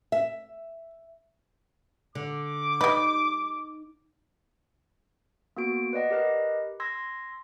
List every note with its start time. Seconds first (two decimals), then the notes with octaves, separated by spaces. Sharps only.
0.12 E5
2.15 D3 D6
2.81 G3 D#4 B4
5.57 A#3 B3 F#4 D7
5.93 B4 D5 D#5 F#5
6.10 G4 A#4 B4 D#5
6.80 C6 E6 G#6 A#6